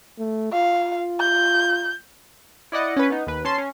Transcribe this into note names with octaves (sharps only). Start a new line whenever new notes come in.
A3
F4 F5
G6
E4 D5 D#5 F#5
C#4 B4
B3 D#4
D#2 B4
C#4 A5 C6 C7
C#4